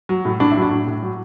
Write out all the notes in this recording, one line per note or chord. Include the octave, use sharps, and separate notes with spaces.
F#3
A2
A2 D4
F#3 E4
D4
A2
A2
F#3